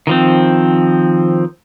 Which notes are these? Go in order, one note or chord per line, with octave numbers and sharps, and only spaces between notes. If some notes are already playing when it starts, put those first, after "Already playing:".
D#3 F3 C4